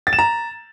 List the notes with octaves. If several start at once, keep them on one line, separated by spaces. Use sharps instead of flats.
A6
E7
A#5